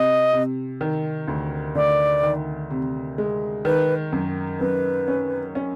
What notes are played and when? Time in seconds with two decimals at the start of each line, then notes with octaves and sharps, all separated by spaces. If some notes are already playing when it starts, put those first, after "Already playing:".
Already playing: C3 D#5
0.33 C3
0.81 D#3
1.28 D2
1.75 D2 D5
2.23 D#3
2.70 C3
3.18 G#3
3.65 D#3 B4
4.12 F#2
4.60 F#2 B4
5.08 C#4
5.55 C#4